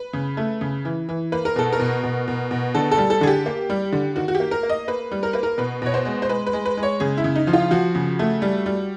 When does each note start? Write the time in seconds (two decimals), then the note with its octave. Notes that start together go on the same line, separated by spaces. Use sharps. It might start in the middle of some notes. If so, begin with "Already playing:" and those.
Already playing: B4
0.13 C#3
0.37 A3
0.61 C#3
0.85 E3
1.09 E3
1.32 A#3 B4
1.45 A#4
1.56 B2 A4
1.72 A#4
1.79 B2
2.03 B2
2.28 B2
2.51 B2
2.74 D3 A4
2.91 A4
2.97 G3
3.10 A4
3.21 D3 G#4
3.27 G4
3.46 A#3
3.70 G3
3.92 D3
4.16 D#3 F#4
4.28 F#4
4.35 G4
4.40 A#3
4.51 A#4
4.63 A#3
4.69 D#5
4.88 A#3 B4
5.11 G3
5.23 A#4
5.33 A#3 B4
5.43 A#4
5.58 B2 B4
5.82 B2 C#5
5.94 C5
6.05 G#3
6.22 C5
6.29 G#3 B4
6.47 B4
6.53 G#3
6.65 B4
6.77 G#3
6.83 C#5
7.00 C#3 G#4
7.18 E4
7.24 C#3
7.36 D#4
7.47 F3
7.53 F4
7.71 F3 F#4
7.95 C#3
8.19 A3
8.42 G3
8.66 G3